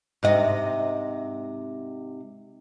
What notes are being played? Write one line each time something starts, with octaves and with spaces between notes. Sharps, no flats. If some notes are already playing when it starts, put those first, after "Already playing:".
G#2 C3 D#5